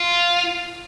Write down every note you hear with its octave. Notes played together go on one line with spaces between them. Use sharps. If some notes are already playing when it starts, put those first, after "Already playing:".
Already playing: F4